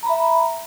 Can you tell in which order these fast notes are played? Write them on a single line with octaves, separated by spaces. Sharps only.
A#5 B5 E5